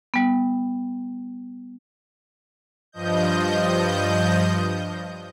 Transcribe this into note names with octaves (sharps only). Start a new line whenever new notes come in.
G3 B3
G2 F3 D#5 G6